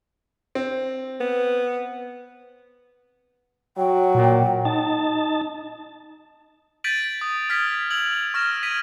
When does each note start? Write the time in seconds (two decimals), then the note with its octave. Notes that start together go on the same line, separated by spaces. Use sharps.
0.55 C4
1.20 B3
3.77 F#3 G5
4.15 A#2
4.65 D#4 A5
6.84 G6 A6 B6 D7 D#7 F#7
7.21 D#6
7.49 D#6 F6 G#6 B6
7.90 E6 G#6 F7 F#7
8.34 C#6 F6 A#6 E7
8.63 G#6 B6 D#7